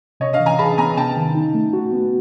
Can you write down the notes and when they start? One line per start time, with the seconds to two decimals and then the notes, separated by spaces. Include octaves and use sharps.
0.20 C3 C#5 D#5
0.33 D#5 F5
0.40 E3
0.46 G#5 A#5
0.59 G#4 A5 B5
0.78 B3 G#5 A#5
0.97 C3 G5 A5
1.17 D#3
1.35 D#4
1.54 A3
1.73 F#4
1.93 B3